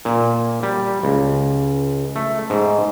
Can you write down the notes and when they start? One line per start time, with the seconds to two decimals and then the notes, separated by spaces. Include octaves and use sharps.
0.05 A#2
0.63 G3
1.03 C#2
2.16 A3
2.50 G#2